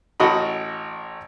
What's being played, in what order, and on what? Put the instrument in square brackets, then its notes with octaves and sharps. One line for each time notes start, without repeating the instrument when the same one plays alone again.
[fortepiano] A1 F#4 D#5 B5